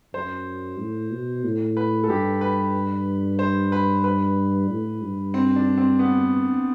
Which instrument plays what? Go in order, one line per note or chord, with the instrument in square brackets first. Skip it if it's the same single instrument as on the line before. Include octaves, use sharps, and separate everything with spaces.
[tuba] F#2 [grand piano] C5
[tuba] A2
B2
A2
[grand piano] B4
A4
[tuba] G2 [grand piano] G4
[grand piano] B4
C5
B4
B4
[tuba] A2
G2
[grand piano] C4
D4
C4
B3